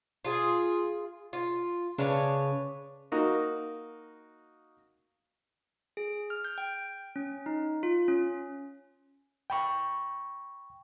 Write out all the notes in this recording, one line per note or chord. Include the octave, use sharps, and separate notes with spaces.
F4 G#4
F4
C#3 D4 B4 C#5
A#3 D#4 F#4 A#4
G#4
F6
G6
G5
C#4
D#4
F4
C#4
G5 B5 C#6